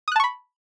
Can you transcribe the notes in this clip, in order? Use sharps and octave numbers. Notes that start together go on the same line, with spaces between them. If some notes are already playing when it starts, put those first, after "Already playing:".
A5 B5 C#6 D#6 F#6